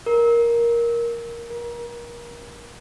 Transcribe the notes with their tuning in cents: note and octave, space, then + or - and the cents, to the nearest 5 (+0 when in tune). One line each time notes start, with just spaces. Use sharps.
A#4 +10
A#4 +30